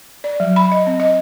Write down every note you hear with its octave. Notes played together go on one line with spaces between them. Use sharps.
D5
F#3
B5
D#5
C4
D#5